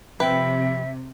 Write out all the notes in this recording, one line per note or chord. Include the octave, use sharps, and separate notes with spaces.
F2 C3 B4 E5 G5